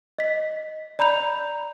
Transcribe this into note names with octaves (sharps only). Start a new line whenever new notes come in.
D#5 B6
D5 A#5 B5 G6 F7